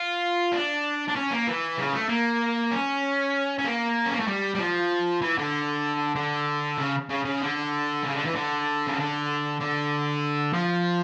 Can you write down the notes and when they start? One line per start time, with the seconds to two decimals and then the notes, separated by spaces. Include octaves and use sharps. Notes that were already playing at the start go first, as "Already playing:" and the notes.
Already playing: F4
0.52 D4
1.08 D4
1.16 C#4
1.31 A#3
1.47 E3
1.78 C#3
1.93 A3
2.09 A#3
2.71 C#4
3.59 C#4
3.65 A#3
4.06 C#4
4.14 A#3
4.20 A3
4.27 G3
4.55 G3
4.59 F3
5.21 E3
5.38 D3
6.15 D3
6.78 C#3
7.09 C#3
7.25 C#3
7.41 D3
8.03 C#3
8.13 D3
8.25 E3
8.35 D3
8.87 C#3
8.97 D3
9.60 D3
10.53 F3